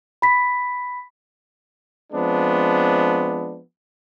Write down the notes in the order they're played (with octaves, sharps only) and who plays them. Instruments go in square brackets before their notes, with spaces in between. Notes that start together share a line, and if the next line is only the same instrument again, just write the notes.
[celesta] B5 B6
[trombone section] F3 G#3 B3 C4 D4